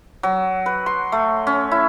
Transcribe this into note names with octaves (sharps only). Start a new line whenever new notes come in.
F#3
B4
C6
A3
C#4
E4